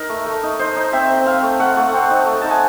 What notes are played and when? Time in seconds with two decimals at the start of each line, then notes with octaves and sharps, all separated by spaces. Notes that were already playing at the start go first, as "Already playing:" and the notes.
Already playing: D#4 A#4
0.09 A3
0.26 A3
0.43 D#4
0.59 D#4 C5
0.76 D#4
0.93 C4 E5
1.09 C4
1.26 C4 F5
1.43 A3
1.59 A3 F#5
1.77 A3
1.93 C4
2.10 D#4
2.26 A3
2.42 D#4 A5
2.51 G#5